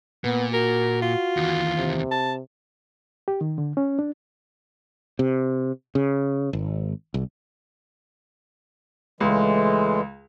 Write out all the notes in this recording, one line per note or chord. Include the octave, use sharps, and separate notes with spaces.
A#2 B3
F#4 A#4
F4
D#2 E3
C3
A5
G4
D#3
D3
C#4
D4
C3
C#3
G#1
C2
C#2 A2 E3 G#3